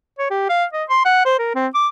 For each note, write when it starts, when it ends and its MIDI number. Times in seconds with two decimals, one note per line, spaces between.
0.19 0.29 73
0.30 0.45 67
0.49 0.65 77
0.73 0.84 75
0.89 1.00 84
1.05 1.25 78
1.25 1.39 72
1.39 1.52 70
1.55 1.67 60
1.74 1.88 86